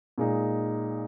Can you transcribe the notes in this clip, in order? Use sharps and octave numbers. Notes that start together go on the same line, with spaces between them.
A#2 G#3 D#4